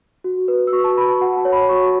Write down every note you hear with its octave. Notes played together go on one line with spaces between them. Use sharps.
F#4
B4
E6
F#4 C#6
A5
B4 B5
A5
F#4 F#5
A5
C#5
B5
F#4 C#6